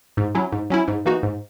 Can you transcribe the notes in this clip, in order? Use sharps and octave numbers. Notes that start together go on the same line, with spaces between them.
G#2
F#3 C#4 E4
G#2
F#3 C#4 E4
G#2
E3 A#3 D#4 F#4
G#2